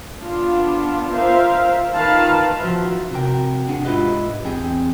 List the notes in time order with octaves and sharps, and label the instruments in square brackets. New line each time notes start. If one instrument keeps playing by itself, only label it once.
[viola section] B3 D4 F4
F4 A#4 C5 E5 F5
D#3 F4 B4 F5 A5 A#5
[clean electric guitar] F3 F#4 C5 E5
C3 F#4 A#4 G5
D4 G#4 F#5
G#2 E4 F4 G4 B4 D#5
E2 C4 G#4 G5